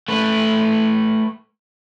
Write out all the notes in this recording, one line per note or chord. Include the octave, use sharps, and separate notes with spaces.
A3 B4